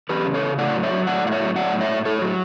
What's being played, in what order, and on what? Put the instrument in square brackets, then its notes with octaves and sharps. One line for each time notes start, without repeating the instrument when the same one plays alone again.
[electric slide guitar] E2 G4 B4
C#3
A4 C#5
C#3
A2 D5 F#5
F#3
C#5 E5
F#3
A2 D5 F#5
A2 F#5
C#5 E5
F#3
F#3 D5 F#5
A2
C#5 E5
A2
A2 A4 C#5
F#3